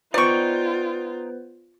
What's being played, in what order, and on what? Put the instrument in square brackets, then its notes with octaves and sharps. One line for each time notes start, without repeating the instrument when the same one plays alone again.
[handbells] B3 B4 C5 [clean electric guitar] D#4 G5 [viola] F4 [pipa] D5 C#6